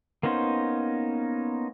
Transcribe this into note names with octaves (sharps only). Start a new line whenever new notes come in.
A#3 B3 C#4 D#4 C5